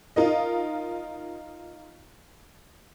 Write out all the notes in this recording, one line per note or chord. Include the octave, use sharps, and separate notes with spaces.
D#4 F4 A#4 D#5